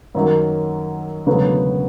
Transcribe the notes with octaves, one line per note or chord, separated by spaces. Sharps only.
F#2 D#3 F#3 A#3
E1 D2 C#3 F#3 B3